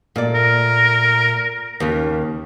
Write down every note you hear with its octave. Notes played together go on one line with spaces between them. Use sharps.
A#2 A3 D5
A#4
D#2 C#3